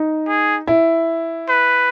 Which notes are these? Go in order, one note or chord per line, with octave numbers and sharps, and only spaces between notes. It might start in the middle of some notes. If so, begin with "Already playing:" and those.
Already playing: D#4
G#4
E4
B4